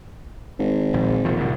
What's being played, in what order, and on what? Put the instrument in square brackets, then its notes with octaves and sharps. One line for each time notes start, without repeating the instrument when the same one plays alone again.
[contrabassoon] G#1
[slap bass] A#1
E1 A#2 F3
C2 A2 G3